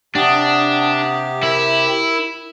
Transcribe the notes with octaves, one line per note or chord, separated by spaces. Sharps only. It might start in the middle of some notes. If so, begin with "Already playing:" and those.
C3 D4 G4 F#5 D#6
E4 A#4